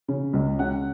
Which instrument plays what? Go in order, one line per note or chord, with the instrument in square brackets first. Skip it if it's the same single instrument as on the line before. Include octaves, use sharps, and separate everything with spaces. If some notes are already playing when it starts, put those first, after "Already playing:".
[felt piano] C#3
C#2
C#3 F#5